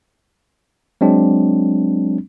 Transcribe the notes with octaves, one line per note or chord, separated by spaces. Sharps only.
F#3 G#3 C4 D4